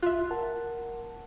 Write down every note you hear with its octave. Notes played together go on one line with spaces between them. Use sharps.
C2 F4 E5 C6 F#6
A#4 F#5 A5